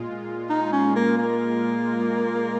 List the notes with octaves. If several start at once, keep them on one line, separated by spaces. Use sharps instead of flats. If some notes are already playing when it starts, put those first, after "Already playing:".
Already playing: A#2 G#3 F4
D#4
C#4
A#3
A#3